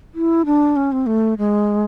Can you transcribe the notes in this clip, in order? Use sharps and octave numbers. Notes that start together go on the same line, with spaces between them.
E4
D4
C#4
C4
A3
G#3